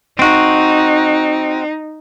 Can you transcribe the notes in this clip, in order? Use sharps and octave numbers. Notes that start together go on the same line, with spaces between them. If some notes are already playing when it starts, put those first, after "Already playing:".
C4 D#4 F#4